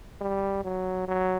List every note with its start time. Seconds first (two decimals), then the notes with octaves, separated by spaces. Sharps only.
0.21 G3
0.65 F#3
1.08 F#3